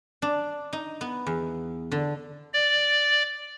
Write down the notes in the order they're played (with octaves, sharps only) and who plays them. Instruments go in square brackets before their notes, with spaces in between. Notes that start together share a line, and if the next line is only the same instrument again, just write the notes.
[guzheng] D4
D#4
B3
E2
D3
[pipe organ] D5